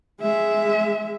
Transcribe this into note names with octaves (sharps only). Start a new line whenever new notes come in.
G#3 E5